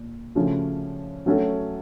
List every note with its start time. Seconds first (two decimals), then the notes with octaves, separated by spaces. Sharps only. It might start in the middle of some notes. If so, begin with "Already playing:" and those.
Already playing: A#2
0.35 C#3 F3 A3 C#4 F#4
1.26 F#3 A3 C#4 F#4 A4